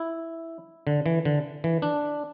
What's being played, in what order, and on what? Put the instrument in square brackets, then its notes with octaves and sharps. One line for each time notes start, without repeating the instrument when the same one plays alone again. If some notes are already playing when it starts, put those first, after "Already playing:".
Already playing: [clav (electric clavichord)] E4
D3
E3
D3
E3
D4